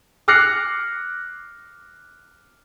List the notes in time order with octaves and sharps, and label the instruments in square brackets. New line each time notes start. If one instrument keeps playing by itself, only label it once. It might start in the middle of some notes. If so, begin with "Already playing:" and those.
[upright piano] D6 F6 F#6 A#6 C7 C#7